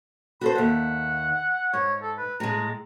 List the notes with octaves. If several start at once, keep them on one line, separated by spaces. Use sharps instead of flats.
F#4 A4 C5 B5
D#2 E5 F#5
G#2 C#5
A4
B4
A2 G#3 A#5